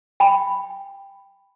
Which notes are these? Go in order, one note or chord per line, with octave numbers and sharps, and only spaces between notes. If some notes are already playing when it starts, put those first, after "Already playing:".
G5 B5